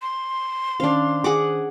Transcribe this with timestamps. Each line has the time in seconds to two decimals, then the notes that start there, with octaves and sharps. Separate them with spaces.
0.02 C6
0.80 D#3 C#4 D4 C5 F5
1.24 G#4 F#5 D6